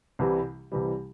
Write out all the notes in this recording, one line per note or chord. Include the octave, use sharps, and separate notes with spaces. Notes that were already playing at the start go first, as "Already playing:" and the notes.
C2 C3 E3 G3
C2 C3 E3 G3